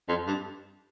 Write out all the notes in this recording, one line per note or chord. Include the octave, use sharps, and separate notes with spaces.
F2
G2